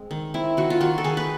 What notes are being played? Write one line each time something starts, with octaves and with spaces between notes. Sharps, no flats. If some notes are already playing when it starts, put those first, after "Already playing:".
Already playing: G#3 C4
D#3
C4 E4
D#3 F#4
F4
D#3 F#4
A4
D#3 G#4
B4